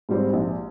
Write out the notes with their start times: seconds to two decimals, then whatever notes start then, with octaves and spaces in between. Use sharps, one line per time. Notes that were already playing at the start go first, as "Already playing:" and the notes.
0.09 G#2 G3 C4
0.33 A#1